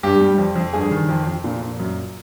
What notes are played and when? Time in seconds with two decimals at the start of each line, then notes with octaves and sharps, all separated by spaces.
0.03 G2 G4
0.21 G3
0.38 F2
0.56 F2
0.73 G2 G#4
0.91 D#3
1.09 F2
1.27 F2
1.44 A#2
1.62 A#2
1.79 F#2